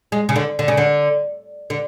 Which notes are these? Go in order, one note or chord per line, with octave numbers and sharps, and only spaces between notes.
G#3
C#3
D3
D3
C#3
D3
D3